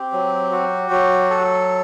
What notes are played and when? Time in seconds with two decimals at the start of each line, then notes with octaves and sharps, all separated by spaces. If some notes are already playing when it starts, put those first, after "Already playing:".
Already playing: C4 G4
0.12 F#3
0.52 F#4
0.91 F#3
1.30 A4